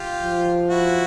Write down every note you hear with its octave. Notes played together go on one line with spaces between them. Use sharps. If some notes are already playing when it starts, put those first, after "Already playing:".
Already playing: F4 G4
F3
E4 F#4